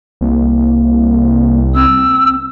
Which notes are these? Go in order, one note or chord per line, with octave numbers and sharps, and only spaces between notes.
C2 A#3
C4 E6